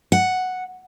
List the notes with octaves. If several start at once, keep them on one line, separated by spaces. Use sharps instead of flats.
F#5